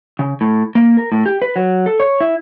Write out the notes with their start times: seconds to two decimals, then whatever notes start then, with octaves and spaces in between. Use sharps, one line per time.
0.19 C#3
0.41 A2
0.75 A#3
0.97 A#4
1.12 A2
1.26 G4
1.42 B4
1.56 F#3
1.86 A4
2.00 C#5
2.20 E4